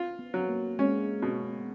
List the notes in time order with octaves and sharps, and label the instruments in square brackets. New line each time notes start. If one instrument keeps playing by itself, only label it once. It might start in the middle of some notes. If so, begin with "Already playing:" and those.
Already playing: [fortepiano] F4
[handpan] B3
[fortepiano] F#3
[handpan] A#3
[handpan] G#3 [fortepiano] C#4
[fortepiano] B2